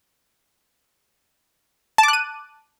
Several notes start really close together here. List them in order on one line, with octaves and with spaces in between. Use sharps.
A5 D6 F#6 D#7